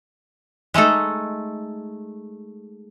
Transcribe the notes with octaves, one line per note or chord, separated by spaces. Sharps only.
G#3 A3 D#4 A4